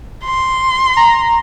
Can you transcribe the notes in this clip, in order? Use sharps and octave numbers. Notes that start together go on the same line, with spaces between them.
C6
A#5